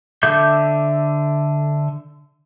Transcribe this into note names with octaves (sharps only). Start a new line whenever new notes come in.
D3 A4 E5 D6 G6